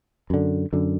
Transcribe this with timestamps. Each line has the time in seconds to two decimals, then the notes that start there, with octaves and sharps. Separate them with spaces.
0.30 F#2 D3
0.73 F#2 D3